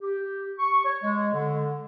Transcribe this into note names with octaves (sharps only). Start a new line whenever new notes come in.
G4
C#6
C#5
G#3
D3